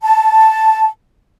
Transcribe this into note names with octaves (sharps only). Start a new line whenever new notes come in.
A5